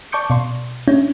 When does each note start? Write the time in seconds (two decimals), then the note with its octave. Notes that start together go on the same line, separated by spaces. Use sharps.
0.12 D5 A5 C#6 D6 G6 C#7
0.30 B2 D5 C6
0.88 C#4 D4 E4 C#5